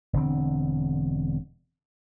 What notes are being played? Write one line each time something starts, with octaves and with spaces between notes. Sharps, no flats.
E1 D3 C4